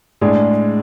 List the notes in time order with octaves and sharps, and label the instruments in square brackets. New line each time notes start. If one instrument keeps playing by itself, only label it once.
[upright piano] A2 G#3 D4 G#4 D5